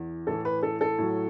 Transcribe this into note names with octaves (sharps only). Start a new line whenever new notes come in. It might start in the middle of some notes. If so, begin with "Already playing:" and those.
Already playing: E2 E3
A2 E3 A4
B4
A4
A4
A2 F#3